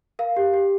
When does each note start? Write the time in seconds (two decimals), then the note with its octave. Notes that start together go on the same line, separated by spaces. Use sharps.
0.19 A#4 F5
0.37 G4
0.54 G4